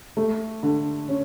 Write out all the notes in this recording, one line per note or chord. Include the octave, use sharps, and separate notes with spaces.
A3
D3
C#4